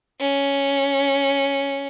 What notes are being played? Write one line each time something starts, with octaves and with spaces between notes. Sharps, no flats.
C#4